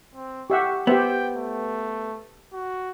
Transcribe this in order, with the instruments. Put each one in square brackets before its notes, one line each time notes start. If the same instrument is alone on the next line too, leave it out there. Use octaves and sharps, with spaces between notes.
[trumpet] C4
[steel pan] G4 E5 F#5 [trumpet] C#6
[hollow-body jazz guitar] B3 [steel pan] G4 C5 E5 [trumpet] G5
[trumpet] A3
F#4